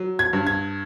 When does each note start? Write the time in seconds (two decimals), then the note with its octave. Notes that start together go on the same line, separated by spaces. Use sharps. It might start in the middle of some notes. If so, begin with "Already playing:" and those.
Already playing: F#3
0.19 G#6
0.33 G2
0.47 G#6